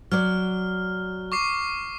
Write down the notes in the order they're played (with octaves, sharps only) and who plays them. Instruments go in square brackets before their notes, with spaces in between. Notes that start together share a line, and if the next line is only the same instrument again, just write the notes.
[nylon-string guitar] F#3 D5 [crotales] F6
[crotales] C#6 D6 C7